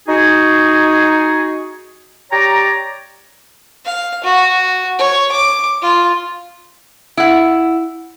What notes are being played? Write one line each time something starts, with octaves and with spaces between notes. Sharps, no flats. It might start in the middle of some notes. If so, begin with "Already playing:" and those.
D#4 F#4 G#4
G4 C#5 D5 G5 A#5
F5
F#4
C#5
D6
F4
E4 F#5